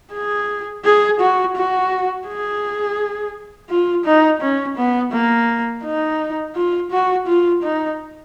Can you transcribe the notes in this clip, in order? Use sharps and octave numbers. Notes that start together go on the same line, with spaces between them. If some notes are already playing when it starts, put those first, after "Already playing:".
G#4
G#4
F#4
F#4
G#4
F4
D#4
C#4
B3
A#3
D#4
F4
F#4
F4
D#4